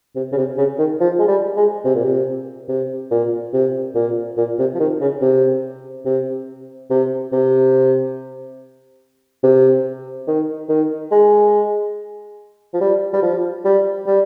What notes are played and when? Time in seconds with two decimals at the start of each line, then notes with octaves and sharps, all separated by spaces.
0.16 C3
0.32 C#3
0.37 C3
0.58 C#3
0.79 D#3
1.00 F3
1.19 G#3
1.28 G3
1.57 G#3
1.85 C3
1.95 A#2
2.05 C3
2.68 C3
3.11 A#2
3.53 C3
3.95 A#2
4.37 A#2
4.59 C3
4.74 F3
4.80 D#3
5.01 C#3
5.21 C3
6.05 C3
6.90 C3
7.33 C3
9.43 C3
10.28 D#3
10.69 D#3
11.12 G#3
12.74 F3
12.80 G3
13.13 G3
13.22 F3
13.65 G3
14.07 G3